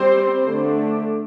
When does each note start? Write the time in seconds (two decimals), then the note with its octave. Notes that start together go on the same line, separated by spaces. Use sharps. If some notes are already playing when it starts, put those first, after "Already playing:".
Already playing: G3 C4 C5
0.46 D3 A3 D4